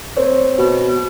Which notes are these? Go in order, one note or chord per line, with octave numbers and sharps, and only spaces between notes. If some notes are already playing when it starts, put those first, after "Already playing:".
C4 C5 C#5
B2